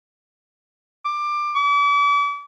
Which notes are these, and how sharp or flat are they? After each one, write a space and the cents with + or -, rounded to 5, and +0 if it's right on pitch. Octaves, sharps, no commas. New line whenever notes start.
D6 +20
D6 -40